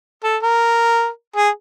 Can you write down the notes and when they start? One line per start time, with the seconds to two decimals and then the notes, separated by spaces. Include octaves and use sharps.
0.24 A4
0.43 A#4
1.36 G#4